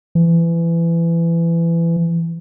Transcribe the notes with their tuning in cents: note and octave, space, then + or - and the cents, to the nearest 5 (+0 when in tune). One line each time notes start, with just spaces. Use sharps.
E3 +25